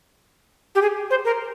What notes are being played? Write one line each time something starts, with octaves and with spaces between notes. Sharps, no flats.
G4
G#4
C5
A#4